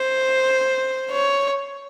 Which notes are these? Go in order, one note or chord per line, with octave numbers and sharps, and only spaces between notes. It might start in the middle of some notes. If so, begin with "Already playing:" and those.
Already playing: C5
C#5